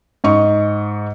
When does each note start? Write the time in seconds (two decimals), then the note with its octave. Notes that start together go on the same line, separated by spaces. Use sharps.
0.24 G#2 D#5 C#6